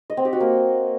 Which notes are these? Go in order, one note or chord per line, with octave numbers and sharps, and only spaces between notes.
D#5
C4
G4
F#4
A#3